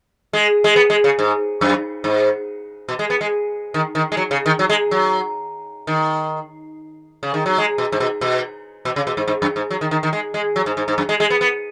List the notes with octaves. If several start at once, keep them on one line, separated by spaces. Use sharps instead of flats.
G#3
G#3
B3
G#3
C#3
G#2
F#2
G#2
B2
G#3
B3
G#3
D#3
D#3
G#3
F#3
C#3
D#3
F#3
G#3
F#3
D#3
C#3
D#3
F#3
G#3
B2
G#2
B2
B2
B2
C#3
B2
G#2
G#2
F#2
G#2
F#3
D#3
D#3
D#3
G#3
G#3
F#3
G#2
G#2
G#2
F#2
G#3
G#3
B3
B3